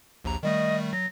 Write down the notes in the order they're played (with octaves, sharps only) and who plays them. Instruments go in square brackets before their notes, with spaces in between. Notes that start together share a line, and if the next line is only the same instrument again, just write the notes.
[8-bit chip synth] A#1 D#2 A#5
[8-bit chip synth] D#3 G3 A3 [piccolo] D#5
[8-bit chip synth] F#3 [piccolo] A#6